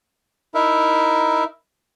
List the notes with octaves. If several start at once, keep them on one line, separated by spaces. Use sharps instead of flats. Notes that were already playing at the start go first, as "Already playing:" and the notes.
D#4 E4 A#4 E5